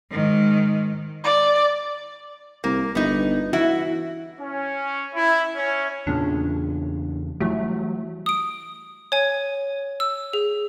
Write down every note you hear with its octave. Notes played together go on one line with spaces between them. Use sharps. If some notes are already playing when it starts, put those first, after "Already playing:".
G#2 D#3
D5
C2 A#3
G1 B3 D#4
E3 E4 F#4
C#4
E4
C#4
E2 A#2 C#3 D4
E3 F#3 G3 A3
D#6 D7
C#5 G#5
E6
G#4